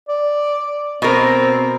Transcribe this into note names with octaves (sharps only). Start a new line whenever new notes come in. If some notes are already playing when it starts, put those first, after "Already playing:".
D5
B2 C4 A#4